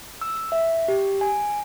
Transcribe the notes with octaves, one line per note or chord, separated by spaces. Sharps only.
E6
E5
G4
G#5